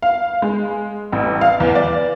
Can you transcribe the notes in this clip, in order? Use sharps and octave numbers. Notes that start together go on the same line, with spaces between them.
F5
G#3
A1
F5
E2
D5